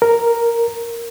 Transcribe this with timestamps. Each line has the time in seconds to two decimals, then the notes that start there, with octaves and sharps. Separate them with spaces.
0.02 A#4